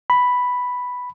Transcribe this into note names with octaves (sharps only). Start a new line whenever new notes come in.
B5